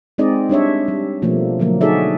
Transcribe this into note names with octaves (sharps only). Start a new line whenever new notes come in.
G#3 C4 D#4 G#4 D5 D#5
G3 D4 C#5 E5
G3
B2 F3 G3 A3 A#3
D3 F3 F#3 A#3
D#4 F#4 G#4 A4 D5 E5